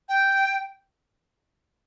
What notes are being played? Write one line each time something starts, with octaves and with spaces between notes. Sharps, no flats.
G5